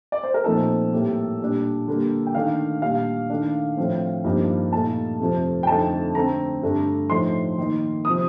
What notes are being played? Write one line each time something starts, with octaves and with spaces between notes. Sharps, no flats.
D5
C5
A#4
A#2 F3 A3 C4 D#4 A4
A2 G3 A#3
A#2 G3 D4
D3 G3 A#3
G5
D#3 A3 D4 F5
A#2 G3 D4 F5
D#3 A3 D4
A2 F3 C4
G2 F3 A#3 D#4
A#2 A3 D#4 A5
F2 C3 F3 A3
G5
F2 D3 F3 A3 D#4 A5
D3 A3 C4 A#5
G2 D3 A3 D4
A2 F3 A3 D#4 C6
D#3 A#3 D#4
C3 F3 D#6